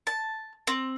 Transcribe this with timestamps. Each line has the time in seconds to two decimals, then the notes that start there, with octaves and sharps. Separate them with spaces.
0.07 A5
0.67 C4